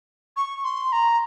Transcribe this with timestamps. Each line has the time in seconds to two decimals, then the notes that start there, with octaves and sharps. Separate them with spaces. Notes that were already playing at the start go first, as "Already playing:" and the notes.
0.36 C#6
0.64 C6
0.92 A#5